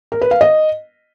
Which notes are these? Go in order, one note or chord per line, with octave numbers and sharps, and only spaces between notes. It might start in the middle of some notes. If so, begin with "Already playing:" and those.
A#4
B4
F5
D#5